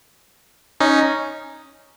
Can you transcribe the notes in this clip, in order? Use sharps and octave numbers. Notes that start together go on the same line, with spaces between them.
C#4 D#4